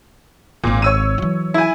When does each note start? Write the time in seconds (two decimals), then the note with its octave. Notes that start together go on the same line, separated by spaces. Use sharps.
0.64 G#1 A#2 C4
0.82 C#5 E6 D#7
1.18 E3 F#3
1.54 E4 G#5